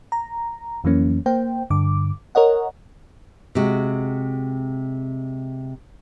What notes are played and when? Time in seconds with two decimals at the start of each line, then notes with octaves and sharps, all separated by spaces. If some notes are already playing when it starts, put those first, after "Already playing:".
0.12 A#5
0.84 F2 E3 F#3 A#3 C#4
1.26 A#3 C5 G5
1.70 G2 D3 D6
2.35 A#4 C#5 D#5 F#5
3.55 C3 G#3 F#4